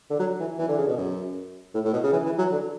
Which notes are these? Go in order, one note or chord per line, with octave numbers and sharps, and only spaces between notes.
D3
F#3
E3
E3
D3
C#3
B2
F#2
A2
A2
B2
C#3
E3
E3
F#3
D3